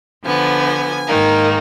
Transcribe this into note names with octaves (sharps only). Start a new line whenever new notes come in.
D3 F3 B3 G#5
G#2 D#3 A#3